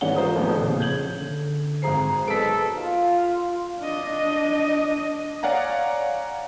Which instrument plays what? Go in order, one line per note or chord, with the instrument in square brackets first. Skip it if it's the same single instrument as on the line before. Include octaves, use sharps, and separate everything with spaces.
[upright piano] G#2 E3 C#4 D5 F#5 G7
F4 A#4 C5 A#5 D#6
A1 E2 A2 D#3 F3 A3
F2 A#2 C#3
C#3 G6 G#6 F#7
[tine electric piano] D3
[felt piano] G#1 G#4 C7 [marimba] C5 A#5
[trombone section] B1 D#3 A4 [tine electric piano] G#4 B4 [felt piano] B6 D7
[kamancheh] F4
[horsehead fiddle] D4 D#5
[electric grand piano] C#5 D5 F5 F#5 G#5 A#5